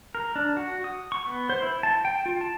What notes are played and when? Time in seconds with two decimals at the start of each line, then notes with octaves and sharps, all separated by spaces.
0.15 A#4
0.36 D4
0.57 F#4
0.84 D#6
1.12 C#6
1.26 B3
1.49 C5
1.62 E4
1.83 A5
2.05 G5
2.26 F4
2.41 A5